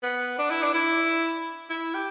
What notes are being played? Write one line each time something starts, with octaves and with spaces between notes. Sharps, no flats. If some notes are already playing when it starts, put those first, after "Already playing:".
B3
D4
E4
D4
E4
E4
G4